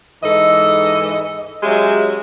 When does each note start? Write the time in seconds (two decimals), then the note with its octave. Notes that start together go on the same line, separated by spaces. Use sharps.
0.23 G#2 E3 A4 D#5
1.63 F#3 G#3 C#4 G4 E5